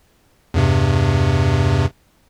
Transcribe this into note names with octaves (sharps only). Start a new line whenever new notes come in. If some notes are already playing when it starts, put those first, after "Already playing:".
E2 G2 C3